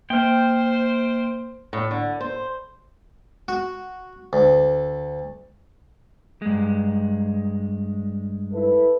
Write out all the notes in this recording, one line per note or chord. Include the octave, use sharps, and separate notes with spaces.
A#3 C5 G5 F6
A2
D3
C5
F#4
D2
G2 G#3
E4 A4 B4